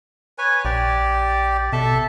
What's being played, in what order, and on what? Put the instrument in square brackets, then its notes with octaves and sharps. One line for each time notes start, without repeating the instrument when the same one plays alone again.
[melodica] B4 C#5 G#5
[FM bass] A#1 [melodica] G4 D5
[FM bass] B2 [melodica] A4 E5 A5